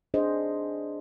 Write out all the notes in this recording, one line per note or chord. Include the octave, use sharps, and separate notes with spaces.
D4 G#4 C5 D#5